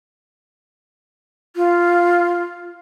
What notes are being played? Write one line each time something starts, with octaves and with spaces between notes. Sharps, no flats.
F4